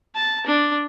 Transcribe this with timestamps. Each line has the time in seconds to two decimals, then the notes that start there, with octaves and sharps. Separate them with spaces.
0.15 A5
0.46 D4